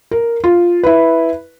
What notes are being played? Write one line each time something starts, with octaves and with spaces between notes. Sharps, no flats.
A#4
F4
E4 B4